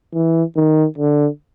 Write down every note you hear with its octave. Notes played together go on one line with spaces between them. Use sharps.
E3
D#3
D3